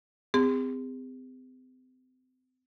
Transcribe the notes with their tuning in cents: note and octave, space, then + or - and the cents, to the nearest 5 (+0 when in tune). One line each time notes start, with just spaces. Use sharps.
C4 -35 G#4 -40